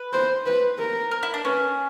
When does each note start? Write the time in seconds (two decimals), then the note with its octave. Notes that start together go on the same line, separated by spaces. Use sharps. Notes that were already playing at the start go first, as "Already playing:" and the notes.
Already playing: B4
0.13 C5
0.46 B4
0.79 A#4
1.11 A#4
1.23 E4
1.34 D4
1.44 C#4 B4